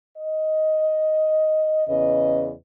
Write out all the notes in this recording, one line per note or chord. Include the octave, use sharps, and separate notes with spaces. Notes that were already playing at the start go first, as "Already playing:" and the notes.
D#5
E2 C#3 B4 D#5